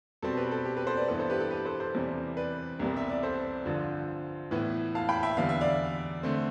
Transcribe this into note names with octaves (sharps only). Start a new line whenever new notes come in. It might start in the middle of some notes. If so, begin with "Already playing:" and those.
B2 G3 C4 A4
G4 B4
A4
G4
G4 B4
A4 C5
B4 D5
G2 E3 B3 A4
A4 C5
G4 B4
A4
G4 B4
A4 C5
A4 C5
E2 C3 E3 G3
B4 D5
C2 C3 G3 B3
E5
D5
A4 C5
G2 D3 F3
A2 E3 B3
F5 A5
G5 B5
E5 G5
E2 D3 G3 B3 F5
E5
D5 F5
D3 A3 C4